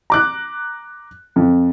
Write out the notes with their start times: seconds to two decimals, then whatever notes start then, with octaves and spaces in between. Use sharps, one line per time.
0.10 A#5 D6 F#6
1.36 F2